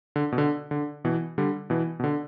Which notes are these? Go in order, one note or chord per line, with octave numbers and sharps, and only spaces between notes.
D3
B2
D3
D3
B2 E3
D3 G3
B2 E3
B2
D3